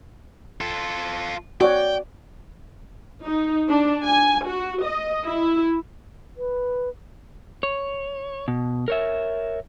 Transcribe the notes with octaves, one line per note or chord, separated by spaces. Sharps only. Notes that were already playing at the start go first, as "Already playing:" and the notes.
F4 A4
F#4 C#5 D5 G5
D#4
D4
G#5
F#4
D#5
E4
B4
C#5
B2
A#4 C#5 E5